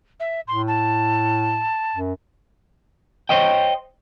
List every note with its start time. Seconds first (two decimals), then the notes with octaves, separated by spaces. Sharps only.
0.20 E5
0.48 A2 C6
0.67 A5
1.95 F#2
3.29 C5 C#5 D#5 G5